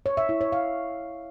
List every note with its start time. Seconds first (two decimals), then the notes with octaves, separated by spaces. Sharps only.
0.06 C#5
0.17 E5
0.29 E4
0.41 C#5
0.52 F5